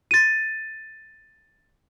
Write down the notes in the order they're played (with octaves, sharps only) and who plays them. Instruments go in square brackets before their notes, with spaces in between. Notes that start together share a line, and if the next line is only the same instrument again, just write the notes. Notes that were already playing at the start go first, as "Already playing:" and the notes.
[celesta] A6 D#7